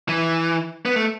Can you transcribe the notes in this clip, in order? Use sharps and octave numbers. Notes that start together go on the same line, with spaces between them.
E3
B3
A3